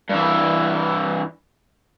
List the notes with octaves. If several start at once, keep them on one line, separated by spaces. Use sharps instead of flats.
G2 E3